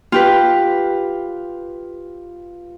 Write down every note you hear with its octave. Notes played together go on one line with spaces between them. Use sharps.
F4 G4 B4